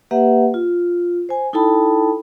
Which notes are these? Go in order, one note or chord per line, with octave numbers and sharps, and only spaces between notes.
A#3 G4 B4 E5 F#5
F4
C5 G#5
D#4 E4 A4 G5 A5 B5